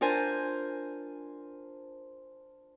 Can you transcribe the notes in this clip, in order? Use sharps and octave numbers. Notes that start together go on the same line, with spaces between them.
D4 F4 A#4 C5 G#5